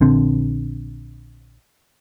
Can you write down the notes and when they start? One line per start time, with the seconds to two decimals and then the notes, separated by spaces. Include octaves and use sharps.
0.01 A#1 D3 C4